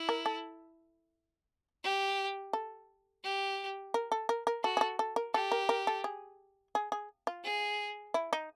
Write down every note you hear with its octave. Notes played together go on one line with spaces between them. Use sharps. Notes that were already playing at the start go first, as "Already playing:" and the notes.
Already playing: E4
A#4
A4
G4
A4
G4
A#4
A4
A#4
A#4
F#4 A4
G#4
A4
A4
A#4
G4 A4
A#4
A#4
A4
G#4
G#4
G#4
F4
G#4
E4
D#4